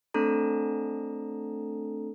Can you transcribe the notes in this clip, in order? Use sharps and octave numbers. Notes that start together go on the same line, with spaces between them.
A3 C4 D4 A4 A#5